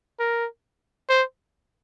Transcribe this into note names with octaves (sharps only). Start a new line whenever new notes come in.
A#4
C5